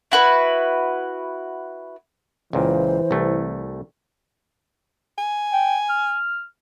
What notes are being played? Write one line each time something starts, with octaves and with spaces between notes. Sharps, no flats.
E4 F#4 B4
C#2 A#2 E3 C5
C2 A3
G#5
G5
F6